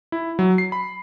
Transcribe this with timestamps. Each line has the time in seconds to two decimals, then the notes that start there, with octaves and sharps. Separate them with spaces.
0.12 E4
0.39 F#3
0.58 C7
0.72 B5